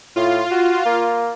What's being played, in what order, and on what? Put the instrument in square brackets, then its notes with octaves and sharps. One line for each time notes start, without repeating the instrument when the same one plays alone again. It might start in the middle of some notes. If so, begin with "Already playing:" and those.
[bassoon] A2 [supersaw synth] F4
[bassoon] F#4
A#3